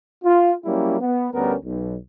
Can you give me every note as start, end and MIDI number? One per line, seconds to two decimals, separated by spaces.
0.24 0.52 65
0.65 0.96 54
0.65 0.96 55
0.65 0.96 58
0.65 0.96 61
0.65 0.96 64
0.65 0.96 67
1.00 1.29 59
1.34 1.54 38
1.34 1.54 55
1.34 1.54 59
1.34 1.54 61
1.34 1.54 70
1.65 1.95 35